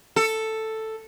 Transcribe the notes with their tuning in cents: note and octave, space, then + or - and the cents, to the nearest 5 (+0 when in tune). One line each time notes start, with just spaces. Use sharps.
A4 +5